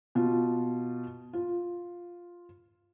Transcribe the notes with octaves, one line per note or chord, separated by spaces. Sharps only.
B2 F4
F4